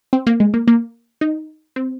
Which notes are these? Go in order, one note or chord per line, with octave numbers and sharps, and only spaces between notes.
C4
A#3
G#3
A#3
A#3
D#4
C4